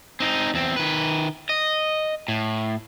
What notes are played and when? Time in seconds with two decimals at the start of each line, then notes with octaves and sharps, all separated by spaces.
0.20 C4 D#4
0.54 E2 C4
0.76 D#3 B4
1.49 D#5
2.28 A2